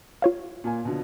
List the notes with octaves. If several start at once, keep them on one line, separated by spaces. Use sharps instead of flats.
F4 C#5 F5
A#2 A#3 G#5
B2 D3 F3